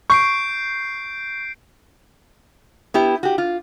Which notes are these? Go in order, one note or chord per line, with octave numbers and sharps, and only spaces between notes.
C#6 G6 C7 D7
B3 E4 G4
F#4 G4
F4